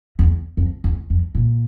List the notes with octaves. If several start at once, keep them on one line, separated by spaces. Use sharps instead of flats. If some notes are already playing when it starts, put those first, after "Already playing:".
E2
F2
E2
F2
A#2